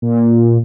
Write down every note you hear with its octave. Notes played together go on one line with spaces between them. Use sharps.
A#2